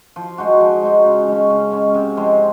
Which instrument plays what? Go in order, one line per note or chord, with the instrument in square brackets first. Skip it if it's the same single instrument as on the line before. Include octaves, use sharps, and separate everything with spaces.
[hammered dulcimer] F3
G#3 D#4 F#4
F3
G#3 D#4 F#4
C#3
G#3 C#4
C#3
G#3 C#4
C3
F3 G#3 C4